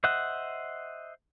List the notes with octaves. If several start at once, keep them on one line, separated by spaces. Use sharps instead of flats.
C5 D#5 E5 F#5